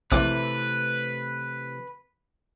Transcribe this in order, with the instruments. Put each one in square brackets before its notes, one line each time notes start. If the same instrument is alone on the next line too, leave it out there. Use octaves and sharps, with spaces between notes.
[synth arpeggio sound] A#1 D6 [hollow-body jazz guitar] C3 E3 A3 [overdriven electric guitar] B4